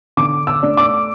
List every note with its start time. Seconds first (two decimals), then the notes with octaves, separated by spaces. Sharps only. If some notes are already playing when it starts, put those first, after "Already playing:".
0.17 D3 D6
0.47 E6
0.63 A3 D4
0.77 D6